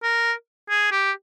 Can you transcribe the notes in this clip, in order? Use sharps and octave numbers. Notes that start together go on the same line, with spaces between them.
A#4
G#4
G4